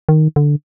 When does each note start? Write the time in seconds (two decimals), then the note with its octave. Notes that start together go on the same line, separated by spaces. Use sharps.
0.09 D#3
0.36 D3